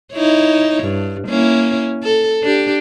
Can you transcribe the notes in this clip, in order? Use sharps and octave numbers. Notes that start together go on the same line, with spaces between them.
D#4 E4 C#5
G2
A#3 C#4 E4
A4
D4 G4